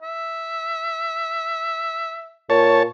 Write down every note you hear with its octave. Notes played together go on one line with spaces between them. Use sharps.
E5
A#2 C#5 A5